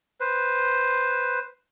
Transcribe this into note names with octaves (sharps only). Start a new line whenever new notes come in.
B4 C5